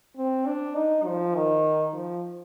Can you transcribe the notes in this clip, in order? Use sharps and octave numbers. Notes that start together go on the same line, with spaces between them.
C4
D4
D#4
F3
D#3
F3